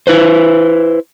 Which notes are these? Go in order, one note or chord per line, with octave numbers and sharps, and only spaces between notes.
E4 B4 C5